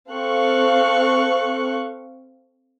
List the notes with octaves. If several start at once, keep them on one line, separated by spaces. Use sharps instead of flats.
C4 A4 F5 C#6 F#6